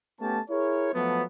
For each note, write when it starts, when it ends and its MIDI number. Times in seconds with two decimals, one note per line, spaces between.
0.21 0.40 57
0.21 0.40 59
0.21 0.40 61
0.21 0.40 67
0.21 0.40 81
0.50 0.94 64
0.50 0.94 68
0.50 0.94 70
0.50 0.94 73
0.94 1.23 53
0.94 1.23 54
0.94 1.23 57
0.94 1.23 59